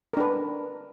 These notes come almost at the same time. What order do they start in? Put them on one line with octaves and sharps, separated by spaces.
A#4 D4 B4